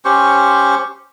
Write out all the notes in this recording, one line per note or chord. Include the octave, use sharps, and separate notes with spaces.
C#4 G4 C5 C#6